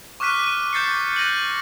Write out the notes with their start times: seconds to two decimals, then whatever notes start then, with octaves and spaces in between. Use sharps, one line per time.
0.20 C#6 D6 F6 F#6 B6 D#7
0.44 D#7
0.73 D6 G6 A6 C7 C#7
1.16 F#6 A#6 D#7 F#7